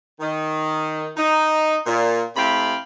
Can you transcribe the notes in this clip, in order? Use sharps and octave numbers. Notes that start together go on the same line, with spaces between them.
D#3
D#4
A#2
C3 A3 E4 F5 G5 B5